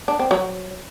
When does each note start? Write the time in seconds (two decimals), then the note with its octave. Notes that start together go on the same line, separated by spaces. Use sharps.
0.08 D4
0.19 C4
0.31 F#3